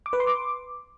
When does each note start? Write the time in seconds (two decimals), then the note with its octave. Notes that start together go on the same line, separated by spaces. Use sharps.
0.06 D6
0.13 B4
0.20 C6
0.27 D6